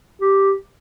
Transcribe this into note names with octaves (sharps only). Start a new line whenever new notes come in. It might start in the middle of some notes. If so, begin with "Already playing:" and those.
G4